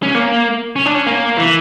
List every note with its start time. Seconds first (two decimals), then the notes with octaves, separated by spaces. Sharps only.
0.03 C#4
0.15 A#3
0.76 C#4
0.86 D4
0.95 C#4
1.06 A#3
1.37 E3